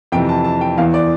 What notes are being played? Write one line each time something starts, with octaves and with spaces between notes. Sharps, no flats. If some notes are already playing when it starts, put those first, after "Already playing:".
F2 C3 E3 G5
A5
A5
G5
E2 E3 F5
D5